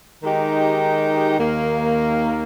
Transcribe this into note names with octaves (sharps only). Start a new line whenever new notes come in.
D#3 G#3 D#4 G4
D#2 D#3 A#3